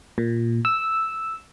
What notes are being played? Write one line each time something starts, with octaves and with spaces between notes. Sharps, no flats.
A#2
E6